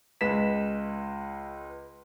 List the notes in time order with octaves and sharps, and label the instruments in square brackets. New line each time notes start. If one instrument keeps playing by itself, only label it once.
[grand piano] C#2 G#3 B4 B6 E7